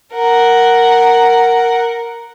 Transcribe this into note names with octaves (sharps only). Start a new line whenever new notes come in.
A#4 F#5